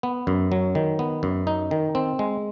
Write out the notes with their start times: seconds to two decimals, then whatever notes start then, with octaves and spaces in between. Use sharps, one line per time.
0.03 B3
0.27 F#2
0.52 F#3
0.75 D#3
0.99 B3
1.23 F#2
1.47 D#4
1.71 D#3
1.95 C4
2.19 G#3